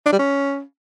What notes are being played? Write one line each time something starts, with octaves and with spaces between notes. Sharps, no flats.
D4
G3
C#4